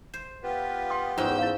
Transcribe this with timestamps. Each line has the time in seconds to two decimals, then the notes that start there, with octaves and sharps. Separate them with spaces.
0.14 C5
0.43 B3 F4 G4 B4
0.90 G5 C6 D#6
1.18 E2 G#2 C#4 F4 C5 E6 G6
1.39 E4 F5